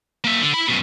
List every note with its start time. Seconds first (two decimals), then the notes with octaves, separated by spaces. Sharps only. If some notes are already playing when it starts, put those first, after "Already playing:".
0.24 A#3 E5
0.41 D3
0.54 E4 B5
0.68 F#2 B2